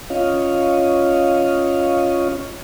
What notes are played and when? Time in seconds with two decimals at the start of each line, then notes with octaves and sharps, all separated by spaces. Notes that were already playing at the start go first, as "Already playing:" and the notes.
0.10 C#4 F4 C#5 D#5 F5